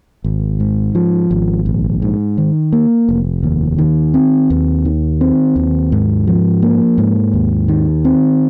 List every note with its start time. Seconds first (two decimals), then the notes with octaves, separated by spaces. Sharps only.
0.24 G#1
0.60 G#2
0.95 F3
1.31 G#1
1.66 A#1
2.02 G#2
2.38 D#3
2.73 A#3
3.09 F1
3.43 D#2
3.78 D#3
4.14 C4
4.50 D#2
4.85 D#3
5.21 C4
5.56 D#2
5.92 G#2
6.27 F3
6.62 A#3
6.98 G#2
7.33 D#2
7.68 D#3
8.05 C4